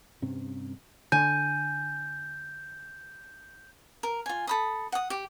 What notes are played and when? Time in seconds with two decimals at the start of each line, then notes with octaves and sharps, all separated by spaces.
0.22 G2 C3 C4 C#4
1.12 D3 G#5 G6
4.03 A#4
4.26 F4 G#5
4.47 A4 B5 D#6
4.92 F#5 D#6
5.10 G4